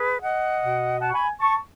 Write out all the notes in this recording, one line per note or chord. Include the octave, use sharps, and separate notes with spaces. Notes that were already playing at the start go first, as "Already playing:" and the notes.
Already playing: G#4 B4
D#5 F#5
B2
F#5 A5
C#6
G#5 B5
A5 C#6